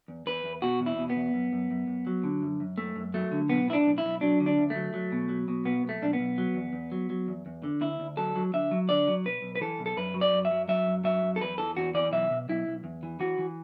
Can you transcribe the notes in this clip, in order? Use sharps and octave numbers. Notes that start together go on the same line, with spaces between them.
E2
E2 B4
E2
B2 F#4
E2
E4
B2
B3
E2
F#2
F#2
F#2
F#2
F#3
D3
F#2
F#2
F#2 A3
F#2
F#3 A3
D3
B1 B3
A2 E4
D4
B1
E4
B1
F#3 D4
D3
D4
D2
F#3 A3
F#3
B2
F#3
B2
B1 B3
B1
A3
B1 D4
B3
B1
F#3
E2
E2
F#3
F#3
E2
E2
D3
D2 E4
D2
F#3 A4
F#3
D3 E5
F#3
D3 D5
F#3
B1 B4
B1
B4
E3 A4
B1
A4
F#2 B4
F#3
D5
F#2
E5
F#3
F#3 E5
F#2
F#3 E5
F#2
A4
E2 B4
E3 A4
E2 F#4
E3 D5
B1 E5
B2
B1 E4
B1
E2
E3
E3 F#4
E3